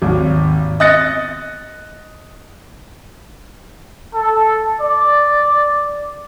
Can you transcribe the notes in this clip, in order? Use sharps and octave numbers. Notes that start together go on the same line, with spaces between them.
G#1 D#2
D#5 D#6 F#6 A6 A#6 C#7
A4
D5